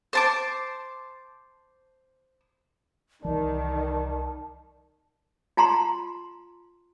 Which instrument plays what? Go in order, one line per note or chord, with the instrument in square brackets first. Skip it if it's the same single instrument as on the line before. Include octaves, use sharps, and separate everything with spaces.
[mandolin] C5 A5 D6
[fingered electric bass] C2 E3 [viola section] D#3 [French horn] D5 [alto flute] A5
[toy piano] F4 A5 A#5 C6